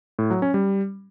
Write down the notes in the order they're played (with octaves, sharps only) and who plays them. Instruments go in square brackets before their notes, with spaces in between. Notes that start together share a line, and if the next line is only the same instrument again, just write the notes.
[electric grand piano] A2
F#3
C#4
G3